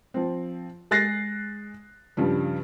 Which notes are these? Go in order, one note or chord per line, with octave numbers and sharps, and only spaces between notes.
F3 C4
G#3 F#6 A6 A#6 C7
G2 C#3 F3 G3